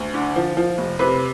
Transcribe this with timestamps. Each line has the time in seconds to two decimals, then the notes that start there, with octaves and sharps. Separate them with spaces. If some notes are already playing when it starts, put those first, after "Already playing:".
Already playing: D2
0.14 D3
0.36 F3
0.57 F3
0.78 F1
0.99 C3 B4